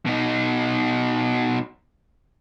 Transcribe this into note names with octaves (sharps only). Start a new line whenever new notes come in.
B2 D#4